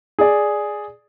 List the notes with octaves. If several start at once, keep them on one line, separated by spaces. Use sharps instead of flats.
G#4 D5